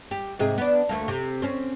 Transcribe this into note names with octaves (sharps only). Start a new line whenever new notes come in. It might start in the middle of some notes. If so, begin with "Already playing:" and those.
G4
G#2 C3 G#4
B3 D4
D2 A3 A#3
C3
C4 C#4